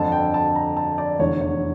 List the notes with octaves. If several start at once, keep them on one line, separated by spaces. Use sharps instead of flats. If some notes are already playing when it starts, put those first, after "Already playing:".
Already playing: G1 F2 D3 A5
G5
A5
A#5
A5
D5
F1 E2 D3 C#5
C#5